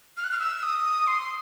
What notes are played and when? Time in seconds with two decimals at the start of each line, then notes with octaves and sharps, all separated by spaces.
0.17 F6
0.24 F#6
0.32 F6
0.39 E6
0.63 D#6
1.07 C6